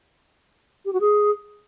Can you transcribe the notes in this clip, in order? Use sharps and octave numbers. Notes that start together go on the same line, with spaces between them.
G4
F#4
G#4